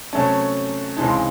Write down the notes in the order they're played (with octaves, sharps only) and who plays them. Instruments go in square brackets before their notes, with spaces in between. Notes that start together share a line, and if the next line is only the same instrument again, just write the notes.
[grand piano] C3 F#3 A3 C#4 A5
C#2 C3 E3 G#3 D#4 A5
C6